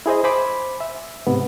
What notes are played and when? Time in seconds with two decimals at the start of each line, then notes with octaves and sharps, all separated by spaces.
0.06 E4 G#4 C5 D#5
0.24 C5 G#5 B5 D6
0.80 E5
1.27 G#2 C3 B3